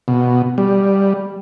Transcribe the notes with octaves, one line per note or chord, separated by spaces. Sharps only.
B2
G3